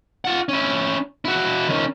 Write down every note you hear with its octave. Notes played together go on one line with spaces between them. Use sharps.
F4 F#5
C#4 E4
E4 F#4
D#3 C#4